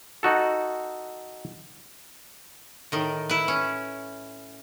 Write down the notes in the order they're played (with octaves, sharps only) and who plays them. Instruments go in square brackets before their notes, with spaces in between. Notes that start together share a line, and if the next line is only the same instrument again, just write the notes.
[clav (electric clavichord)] D#4 F#4 A4
[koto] A2 D#3
E4 B4
C#4